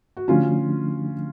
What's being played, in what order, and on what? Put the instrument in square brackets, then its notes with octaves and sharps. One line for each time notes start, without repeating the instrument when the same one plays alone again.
[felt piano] F#4
[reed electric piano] D3 F3 A3 D4 [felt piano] C#4 F4